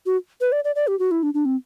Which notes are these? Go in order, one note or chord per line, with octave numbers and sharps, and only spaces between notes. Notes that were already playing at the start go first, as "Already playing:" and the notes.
F#4
B4
D5
D5
D5
G4
F#4
E4
D4
D4
C4